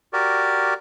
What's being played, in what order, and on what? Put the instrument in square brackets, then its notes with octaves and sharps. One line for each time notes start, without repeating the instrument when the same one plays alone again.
[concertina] F#4 G4 A#4 D5